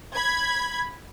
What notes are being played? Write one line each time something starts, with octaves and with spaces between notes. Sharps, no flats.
B5 G#6